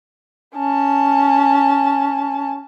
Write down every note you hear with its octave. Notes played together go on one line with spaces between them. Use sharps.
C#4 A5